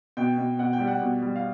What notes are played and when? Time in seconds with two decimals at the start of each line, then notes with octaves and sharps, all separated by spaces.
0.17 B2 G5
0.38 B2
0.59 B2 F#5
0.73 G5
0.80 G3
0.87 F#5
1.01 B2
1.22 G3
1.36 F5